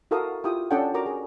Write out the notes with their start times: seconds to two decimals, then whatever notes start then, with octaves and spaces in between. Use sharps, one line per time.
0.11 E4 F#4 A4 A#4 F5 D#6
0.44 E4 F4 G4 G5 D#6
0.71 C#4 D4 A4 D5 F#5 G5
0.94 F#4 A#4 A#5 D6
1.06 G#4